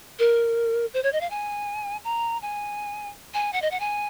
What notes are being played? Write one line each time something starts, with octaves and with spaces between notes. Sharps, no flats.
A#4
C5
C#5
D#5
F5
G#5
A#5
G#5
G#5
F#5
D#5
F#5
G#5